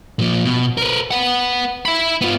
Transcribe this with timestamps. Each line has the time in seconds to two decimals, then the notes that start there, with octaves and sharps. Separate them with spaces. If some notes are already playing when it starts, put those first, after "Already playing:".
0.19 A#2 F3
0.45 B2
0.77 A#4 B4
1.11 B4 F#5
1.85 E5 B5
2.21 B3 F4